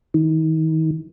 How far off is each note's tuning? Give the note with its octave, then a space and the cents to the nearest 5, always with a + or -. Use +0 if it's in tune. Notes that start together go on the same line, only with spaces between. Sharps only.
D#3 +35